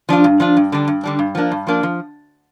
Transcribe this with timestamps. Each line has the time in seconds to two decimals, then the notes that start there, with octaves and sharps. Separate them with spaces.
0.09 F3 D4 F4
0.24 G2
0.40 F3 D4 F4
0.57 G2
0.72 D3 G3 D4
0.88 G2
1.04 D3 G3 D4
1.19 G2
1.35 F3 A#3 D4
1.52 G2
1.67 F3 A#3 D4
1.83 F3